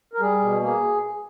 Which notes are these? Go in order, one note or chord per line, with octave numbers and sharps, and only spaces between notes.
A#4
G3 G#4
B2
A#3 G#4